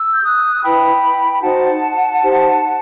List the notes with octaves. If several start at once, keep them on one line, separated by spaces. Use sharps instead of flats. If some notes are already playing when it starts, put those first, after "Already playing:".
Already playing: E6
G6
D#6 F#6
E4 B4 G5 B5
B5
D#4 F#4 C5 F#5 A5
D#4 G4 C5